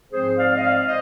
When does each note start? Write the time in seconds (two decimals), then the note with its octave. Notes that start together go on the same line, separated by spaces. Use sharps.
0.11 G#2 F3 G#3 C4 G#4 C5
0.36 D5 F5
0.56 D#5
0.61 D5 F5
0.86 C5 D#5